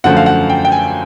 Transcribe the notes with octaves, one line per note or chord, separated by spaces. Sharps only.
F#2 D3 F3 A3 F#5
F5
F#5
G5
G5
G#5